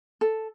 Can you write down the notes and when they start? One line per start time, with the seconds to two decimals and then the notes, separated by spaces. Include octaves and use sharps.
0.21 A4